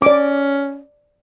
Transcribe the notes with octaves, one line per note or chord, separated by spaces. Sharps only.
C#4 D5 D6